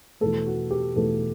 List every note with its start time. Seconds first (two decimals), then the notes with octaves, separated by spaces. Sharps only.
0.21 E2 B2 A3 A4
0.46 F#4
0.71 G4
0.96 E2 B2 A3 A4